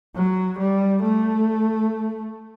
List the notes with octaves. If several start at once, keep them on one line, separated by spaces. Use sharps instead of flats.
F#3
G3
A3